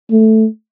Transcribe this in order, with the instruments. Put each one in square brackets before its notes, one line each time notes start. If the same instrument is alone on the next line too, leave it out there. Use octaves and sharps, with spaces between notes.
[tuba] A3